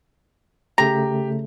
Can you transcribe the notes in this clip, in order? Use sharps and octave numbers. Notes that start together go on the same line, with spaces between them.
C#3 A3 G4 A#5